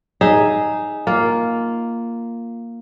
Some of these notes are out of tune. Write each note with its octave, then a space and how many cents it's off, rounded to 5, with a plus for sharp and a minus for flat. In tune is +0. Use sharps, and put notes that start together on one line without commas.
D#4 +0 G#4 +0 E5 +0
A#3 +0 F4 +0